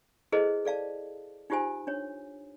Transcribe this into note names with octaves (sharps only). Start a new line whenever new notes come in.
E4 G#4 A4 B4 C5 D#5
A4 D5 F5 A5
D#4 F4 G4 C5 G#5
D4 C#5